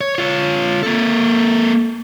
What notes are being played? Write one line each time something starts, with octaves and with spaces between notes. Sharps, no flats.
C#5
F4 C#5
A#3 A4